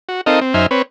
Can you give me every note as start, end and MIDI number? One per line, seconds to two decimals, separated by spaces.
0.09 0.21 66
0.26 0.40 60
0.26 0.40 63
0.26 0.40 69
0.26 0.40 70
0.26 0.40 75
0.26 0.40 77
0.41 0.54 60
0.54 0.66 42
0.54 0.66 63
0.54 0.66 72
0.54 0.66 76
0.54 0.66 80
0.54 0.66 89
0.71 0.82 60
0.71 0.82 71
0.71 0.82 73